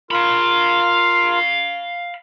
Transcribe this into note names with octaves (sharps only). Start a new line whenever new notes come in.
F4 A#4 F5 B5